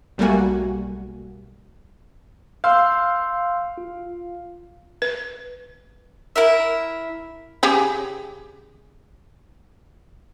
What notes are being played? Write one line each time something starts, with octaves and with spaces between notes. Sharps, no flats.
B1 G3 A3 A#3 F#4 G#5
F5 C6 E6 G6
F4
B4
E4 A#4 E5
C#3 G4 G#4